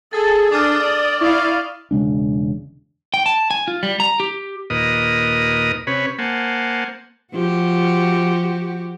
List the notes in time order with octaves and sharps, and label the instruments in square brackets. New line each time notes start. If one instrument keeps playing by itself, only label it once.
[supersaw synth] G#4 [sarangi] A4 [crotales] A6
[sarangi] D4 [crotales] D6 F6 [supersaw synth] D#6
[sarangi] D5
[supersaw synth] E4 F5 [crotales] C#6 D#6
[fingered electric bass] E1 C#3 G#3 D4
[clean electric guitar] G5
A5
G#5
F4
G3
A#5
G4
[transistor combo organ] D#2 A#2 A#4 B4 D#5 D#6
C3 C#4 B4 C#5 B5
A#3 C5 F#5 G#5 A5
[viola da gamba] F3 F#4 G4